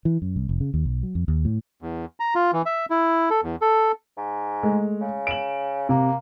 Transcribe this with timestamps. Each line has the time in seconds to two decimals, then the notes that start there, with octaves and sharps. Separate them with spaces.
0.05 E3
0.22 F#2
0.36 C2
0.49 F1
0.61 C#3
0.74 D#2
0.85 B1
1.03 F#3
1.15 F2
1.28 D#2
1.45 A2
1.82 E2
2.20 A#5
2.35 F4
2.53 E3
2.66 E5
2.90 E4
3.30 A4
3.44 E2
3.62 A4
4.17 G#2
4.63 G#3 A3
5.01 C#3
5.27 D7 E7 F#7
5.89 C3 A#3